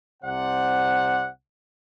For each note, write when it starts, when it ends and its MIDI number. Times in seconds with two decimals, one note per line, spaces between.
0.23 1.28 36
0.23 1.28 48
0.23 1.28 72
0.23 1.28 74
0.23 1.28 78